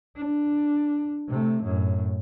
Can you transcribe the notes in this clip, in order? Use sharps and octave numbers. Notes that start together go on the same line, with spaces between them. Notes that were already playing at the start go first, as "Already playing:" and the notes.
D4
C3 A3
F#2 A2